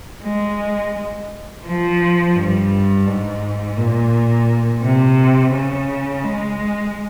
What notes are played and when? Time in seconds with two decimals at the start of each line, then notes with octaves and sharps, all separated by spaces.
0.24 G#3
1.65 F3
2.35 G2
3.06 G#2
3.77 A#2
4.83 C3
5.53 C#3
6.23 G#3